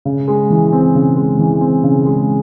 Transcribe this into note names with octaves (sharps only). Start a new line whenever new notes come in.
C#3
G#3
E3
C4
C#3
G#3
E3
C4
C#3
G#3